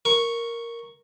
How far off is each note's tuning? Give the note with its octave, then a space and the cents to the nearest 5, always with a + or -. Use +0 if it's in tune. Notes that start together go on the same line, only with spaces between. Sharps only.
A#4 +0 C#6 +0